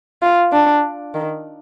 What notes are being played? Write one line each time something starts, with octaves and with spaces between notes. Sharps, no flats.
F4
D4
D#3